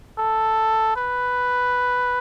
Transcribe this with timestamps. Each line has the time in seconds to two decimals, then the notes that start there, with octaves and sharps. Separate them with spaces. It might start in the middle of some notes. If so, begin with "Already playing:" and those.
0.19 A4
0.96 B4